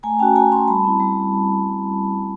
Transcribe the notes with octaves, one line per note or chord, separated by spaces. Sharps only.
A3 G#5 A#5
C#4 F#4 G5 A5
A3 G#5 A#5
C#4 F#4 A#5 C6
G3 A5 B5
C4 E4
G3